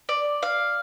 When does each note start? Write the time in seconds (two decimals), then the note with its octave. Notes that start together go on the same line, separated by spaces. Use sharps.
0.09 D5
0.43 F5